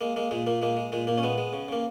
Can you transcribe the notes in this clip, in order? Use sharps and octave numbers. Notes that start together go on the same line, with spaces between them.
G#3 A#3
G#3 A#3
A#2 G#3
A#2 A#3
G#3 A#3
G#3
A#2 G#3
A#2 A#3
C#4
G#3 B3
G#3
C#3
C#3 A#3